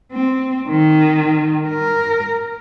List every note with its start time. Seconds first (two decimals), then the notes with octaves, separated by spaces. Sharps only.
0.12 C4
0.68 D#3
1.69 A#4